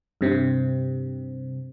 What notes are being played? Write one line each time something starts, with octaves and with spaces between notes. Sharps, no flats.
G2 C3 C4